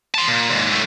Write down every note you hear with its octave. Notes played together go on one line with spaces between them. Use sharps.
A5 C6
A#2
D#2 G#2
F#2 A3